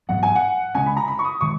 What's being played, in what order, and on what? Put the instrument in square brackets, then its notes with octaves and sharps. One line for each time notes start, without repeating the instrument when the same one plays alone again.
[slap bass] G#2 F#3 B3 [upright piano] F#5
[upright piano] G#5
F#5
[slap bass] C#3 G#3 C#4 [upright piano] G#5
[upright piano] B5
A#5
B5
C#6
D#6
[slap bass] D#3 G#3 [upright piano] C#6